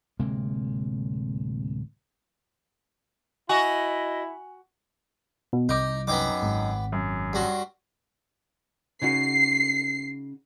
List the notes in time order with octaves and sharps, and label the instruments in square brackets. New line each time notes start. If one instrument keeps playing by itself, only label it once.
[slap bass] D1 C3 G#3 A#3
[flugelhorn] E4 [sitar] F#4 [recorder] D#5 [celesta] G#5 F7
[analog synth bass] B2
[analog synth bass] C2 [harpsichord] D#4 [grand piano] D6 G6
[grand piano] F#2 D#4 [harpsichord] B3 G5 D6
[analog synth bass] G#1
[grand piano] F#2
[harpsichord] G2 F#4 C6
[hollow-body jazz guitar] C#3 D#4 F#4 [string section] C7